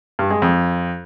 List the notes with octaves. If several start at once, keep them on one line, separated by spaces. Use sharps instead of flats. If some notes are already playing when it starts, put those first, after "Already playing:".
G2
G#3
F2